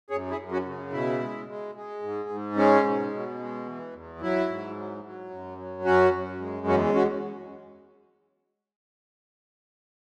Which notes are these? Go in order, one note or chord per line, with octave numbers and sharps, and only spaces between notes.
F#2 G#4 C#5
E4 G#4
F#2
C#4 F#4
C#3
B2 E4
G#3
G#3
G#3
G#2
G#2
G#3 C#4
B2
B2
G#3
E3
E2
F#3 E4
G#2
F#3
F#3
F#2
F#3
F#2 C#4 F#4
F#2
G#3
E2 C#4 F#4
C#4 F#4